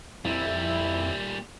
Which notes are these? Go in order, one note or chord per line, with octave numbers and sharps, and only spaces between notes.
F2 A#2 G3 E4